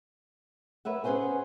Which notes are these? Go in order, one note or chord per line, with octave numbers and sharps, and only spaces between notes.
A#4 B4 C#5 E5 F#5
C#4 G#4 B4 C5 F#5 G#5